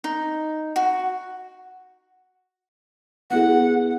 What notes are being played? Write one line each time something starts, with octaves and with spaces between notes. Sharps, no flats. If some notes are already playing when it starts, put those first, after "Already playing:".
D#4
F#4
B3 E4 G#4 F#5